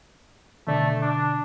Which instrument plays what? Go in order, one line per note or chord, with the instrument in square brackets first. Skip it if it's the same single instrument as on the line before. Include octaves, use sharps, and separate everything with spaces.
[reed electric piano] B2 D3 D5 [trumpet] A3
[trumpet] D4